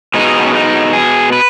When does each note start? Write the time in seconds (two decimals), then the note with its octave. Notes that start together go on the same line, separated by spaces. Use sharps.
0.14 B2 G#3 D#4
0.39 B3
0.46 C#4
0.54 D#4
0.93 G#4
1.32 B4